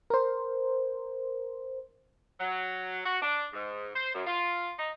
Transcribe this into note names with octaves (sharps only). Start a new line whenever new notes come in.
A#4 C5
F#3
F#4
D4
G#2
C5
F#2
F4
D#4